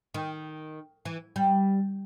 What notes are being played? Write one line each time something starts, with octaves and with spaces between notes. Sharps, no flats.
D#3
E3
G3